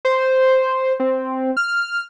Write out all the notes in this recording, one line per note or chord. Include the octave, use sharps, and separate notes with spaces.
C5
C4
F6